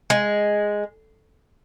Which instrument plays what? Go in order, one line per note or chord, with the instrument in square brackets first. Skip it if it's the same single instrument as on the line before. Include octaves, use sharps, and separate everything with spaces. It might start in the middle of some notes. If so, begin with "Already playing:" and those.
[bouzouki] G#3